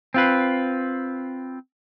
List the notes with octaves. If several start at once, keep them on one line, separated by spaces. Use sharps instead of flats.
C4 F4 B4